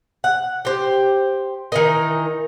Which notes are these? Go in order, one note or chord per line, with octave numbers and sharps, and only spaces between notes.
F#5
G4 C5
D#3 E3 D#4 A#4